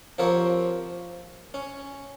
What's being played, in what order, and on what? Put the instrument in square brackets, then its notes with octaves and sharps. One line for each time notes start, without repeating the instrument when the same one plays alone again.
[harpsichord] F3 C4 G4 A#4 C#5
C#4